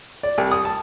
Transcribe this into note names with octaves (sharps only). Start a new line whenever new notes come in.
D5
C2
D#6
A5